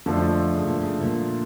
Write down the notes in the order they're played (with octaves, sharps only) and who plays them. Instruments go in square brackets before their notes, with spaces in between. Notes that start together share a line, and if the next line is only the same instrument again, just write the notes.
[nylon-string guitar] F2 [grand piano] D3 F3 A3 D4
[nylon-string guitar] C#3
A#2
C#3
A#2